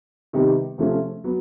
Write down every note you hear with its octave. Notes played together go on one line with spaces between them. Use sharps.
C3 D#3 G3 B3 D#4
C3 F3 A3 C#4
F#3 B3